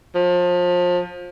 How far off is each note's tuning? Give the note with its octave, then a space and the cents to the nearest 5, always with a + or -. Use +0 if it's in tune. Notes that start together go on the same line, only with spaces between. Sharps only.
F3 +30